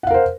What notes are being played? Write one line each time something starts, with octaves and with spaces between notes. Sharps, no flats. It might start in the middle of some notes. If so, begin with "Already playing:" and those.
A#4 C5 F5 F#5